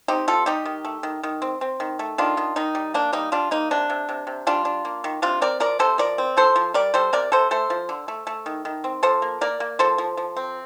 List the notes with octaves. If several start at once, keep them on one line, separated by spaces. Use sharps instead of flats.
C4 D#4 G4
G3 F4 A4
G3 D#4 G4
D#3
A3
D#3
D#3
C4
C4
D#3
A3
D#3 D4 F4
D#3
D#3 D#4
G3
A#3 D4
G3 D#4
G3 D4 F4
A#3 D#4
C3 D4
C3
C3
C3
G3 D4 F4
D4
A#3
D#3
C3 D4 F4
C4 A#4 D5
F3 A#4 D5
C3 A4 C5
F3 A#4 D5
C4
F3 A4 C5
F3
G3 A#4 D5
G3 A4 C5
C3 A#4 D5
C3 A4 C5
A3 A4 C5
F3
D3
A3
A3
D#3
D#3
C4
F3 A4 C5
A#3
A#3 A#4 D5
A#3
F3 A4 C5
F3
F3
C4